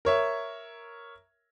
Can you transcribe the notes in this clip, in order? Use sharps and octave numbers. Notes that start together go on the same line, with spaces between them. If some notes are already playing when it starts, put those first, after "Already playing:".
A#4 C#5 E5